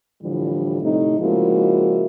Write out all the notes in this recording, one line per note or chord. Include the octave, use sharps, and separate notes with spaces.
A2 D3 E3 F3 G3
A2 C3 A3 D#4
C#3 F3 G#3 A#3 E4 F#4